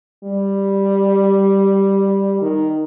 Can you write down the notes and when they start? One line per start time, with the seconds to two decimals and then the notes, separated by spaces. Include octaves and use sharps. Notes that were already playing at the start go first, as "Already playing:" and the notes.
0.23 G3
2.42 D#3